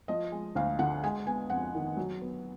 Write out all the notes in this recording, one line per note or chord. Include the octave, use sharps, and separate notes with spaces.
F3 D#5
G#3
D2 F5
D3 F#5
G#3 G#5
B3 G#5
F2 F#5
D#3
F#3
B3